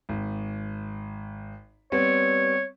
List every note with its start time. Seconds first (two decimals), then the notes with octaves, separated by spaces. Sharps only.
0.09 G#1
1.92 G3 B3 C4 C#5